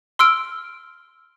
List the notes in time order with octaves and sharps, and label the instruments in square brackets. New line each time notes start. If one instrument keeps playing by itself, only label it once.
[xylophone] C6 E6 F6 D7